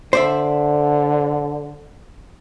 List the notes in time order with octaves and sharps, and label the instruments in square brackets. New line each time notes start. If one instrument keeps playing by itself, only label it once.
[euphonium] D3 [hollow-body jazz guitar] C5 D5 E5